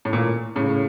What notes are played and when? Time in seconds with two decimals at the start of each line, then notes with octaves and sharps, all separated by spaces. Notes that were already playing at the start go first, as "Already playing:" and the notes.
0.05 A2
0.13 A#2
0.56 A2 C#3